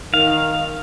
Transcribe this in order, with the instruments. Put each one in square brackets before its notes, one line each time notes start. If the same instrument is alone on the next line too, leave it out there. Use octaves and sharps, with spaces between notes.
[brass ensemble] D#3 [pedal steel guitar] F5